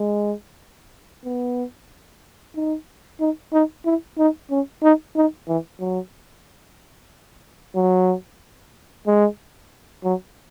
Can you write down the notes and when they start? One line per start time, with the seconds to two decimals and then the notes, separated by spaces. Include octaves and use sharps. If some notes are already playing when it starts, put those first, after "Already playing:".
Already playing: G#3
1.25 B3
2.55 D#4
3.20 D#4
3.53 D#4
3.85 E4
4.18 D#4
4.51 C#4
4.83 D#4
5.16 D#4
5.48 E3
5.80 F#3
7.75 F#3
9.07 G#3
10.04 F#3